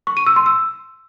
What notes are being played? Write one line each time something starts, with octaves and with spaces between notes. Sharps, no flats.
C#6
D#7
E6
C6
E6